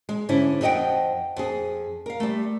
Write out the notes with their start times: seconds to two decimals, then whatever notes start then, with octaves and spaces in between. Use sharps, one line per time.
0.09 G#3
0.29 G#2 D3 C#4 E4
0.61 F2 F3 D#5 F#5 G5
1.36 F2 G#4
2.06 A#4 F5
2.20 G3 A3